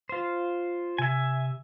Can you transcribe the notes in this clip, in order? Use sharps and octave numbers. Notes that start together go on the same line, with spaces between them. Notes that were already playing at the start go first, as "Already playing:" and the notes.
F4 C5
C3 E5 G#5